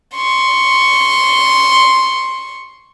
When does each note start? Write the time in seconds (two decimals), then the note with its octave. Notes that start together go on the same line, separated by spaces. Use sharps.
0.15 C6 C#6